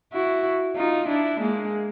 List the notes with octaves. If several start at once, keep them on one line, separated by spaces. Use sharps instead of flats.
E4 F#4
D#4 F4
D4 E4
G#3 A#3